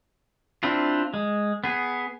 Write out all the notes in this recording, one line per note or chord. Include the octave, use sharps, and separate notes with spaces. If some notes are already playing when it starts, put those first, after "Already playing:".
C4 D4 E4 F4
G#3
B3 G#4